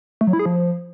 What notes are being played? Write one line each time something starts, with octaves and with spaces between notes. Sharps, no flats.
A3
F#3
E4
G#4
F3